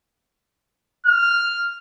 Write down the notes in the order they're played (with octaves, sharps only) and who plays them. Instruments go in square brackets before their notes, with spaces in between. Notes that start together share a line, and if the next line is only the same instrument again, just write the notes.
[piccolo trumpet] F6